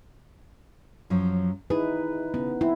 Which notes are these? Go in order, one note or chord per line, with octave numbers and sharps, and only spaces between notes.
F#2 F3 F#3
D#4 E4 G#4 B4
C#3 B3
C4 E4